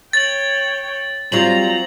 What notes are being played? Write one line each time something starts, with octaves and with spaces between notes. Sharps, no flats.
C#5 G5 A6 F#7
F#3 G3 C4 F4 C5 A#5 F#7